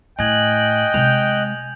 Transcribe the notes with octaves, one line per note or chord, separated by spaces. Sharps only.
A2 D#5 G5 G#5 F#6 G#6 F#7
C3 G#3 G6 F7